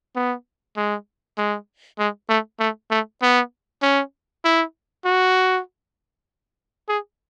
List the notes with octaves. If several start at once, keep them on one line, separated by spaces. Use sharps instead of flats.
B3
G#3
G#3
G#3
A3
A3
A3
B3
C#4
E4
F#4
G#4